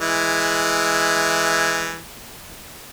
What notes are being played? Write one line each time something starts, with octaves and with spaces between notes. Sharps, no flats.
E3 G#3 E4